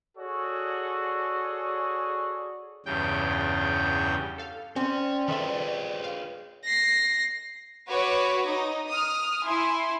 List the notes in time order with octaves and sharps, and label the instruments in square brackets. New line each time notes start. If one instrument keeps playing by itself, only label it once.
[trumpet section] F#4 G#4 A4 C#5 D5
[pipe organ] E2 G2 C#3 G5
[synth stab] A4 F5
[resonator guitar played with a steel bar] C4 [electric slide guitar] C#4 [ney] D5
[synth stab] D#3 A4 E5 [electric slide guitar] G#4 B4 C#5
[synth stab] F5
[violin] A#6 C7
[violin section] F#4 B4 C#5 D6
D#4
D#6 F6
E4 G#5 C6